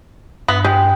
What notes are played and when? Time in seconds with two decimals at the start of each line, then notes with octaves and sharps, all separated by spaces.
0.48 G2 B3
0.64 G#3 G4